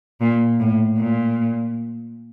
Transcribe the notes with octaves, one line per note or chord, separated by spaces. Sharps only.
A#2
A2
A#2